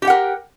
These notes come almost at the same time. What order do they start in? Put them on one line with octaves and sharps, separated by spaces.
G4 G5 F#5 A#4